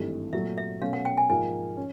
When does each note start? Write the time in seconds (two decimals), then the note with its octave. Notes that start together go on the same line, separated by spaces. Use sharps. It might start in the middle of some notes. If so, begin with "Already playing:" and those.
Already playing: G#1 G2 E3 A3
0.33 A#2 F#3 A3 E5
0.58 E5
0.81 B2 F#3 A3 C#4 F5
0.93 F#5
1.05 G5
1.17 G#5
1.29 G#2 F3 A#3 G#5
1.77 C#4